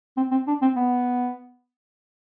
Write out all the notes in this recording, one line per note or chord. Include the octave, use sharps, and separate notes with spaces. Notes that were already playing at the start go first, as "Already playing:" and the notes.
C4
C4
D4
C4
B3